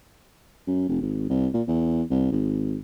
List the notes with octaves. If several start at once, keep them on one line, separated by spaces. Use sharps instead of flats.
F#2
F1
G#1
C2
A#2
E2
C2
G#1